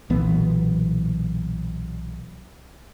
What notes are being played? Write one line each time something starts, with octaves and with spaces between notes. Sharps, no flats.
B1 A#2 E3 B3